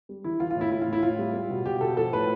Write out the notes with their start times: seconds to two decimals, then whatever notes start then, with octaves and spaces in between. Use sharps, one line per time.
0.09 G3
0.24 E3 E4
0.40 E3 F4
0.51 F4
0.56 A2
0.61 E4
0.72 A2 E4
0.82 F4
0.87 A2
0.93 E4
1.03 A2 F4
1.19 G3
1.34 G3
1.50 B2
1.66 B2 G4
1.81 B2 A4
1.97 F3 A4
2.13 A2 B4